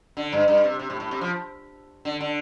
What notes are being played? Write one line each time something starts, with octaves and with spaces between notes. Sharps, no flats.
D3
G2
G2
C3
C3
A2
A2
C3
F3
D3
D3